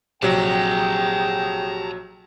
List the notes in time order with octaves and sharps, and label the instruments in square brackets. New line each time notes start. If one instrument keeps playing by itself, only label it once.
[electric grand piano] A#1 F#3 [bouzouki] C3 [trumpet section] G#4 G5 [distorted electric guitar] A5 A#5